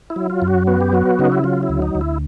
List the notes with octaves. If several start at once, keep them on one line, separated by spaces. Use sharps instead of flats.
E4
F#3
F4
F#2
F#4
B3 F#4
G4
F#3 F#4
C#3 D#4
E4
F#3 F4
E4
D2
D#4
D2
E4